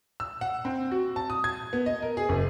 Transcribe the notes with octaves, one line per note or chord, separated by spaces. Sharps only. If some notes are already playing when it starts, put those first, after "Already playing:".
E6
F#5
C4
F#4
A5
D#6
G#6
B3
D#5
A#4
G#4
F#1